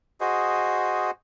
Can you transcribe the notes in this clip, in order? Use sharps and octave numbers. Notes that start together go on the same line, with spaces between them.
F#4 G#4 C5 D#5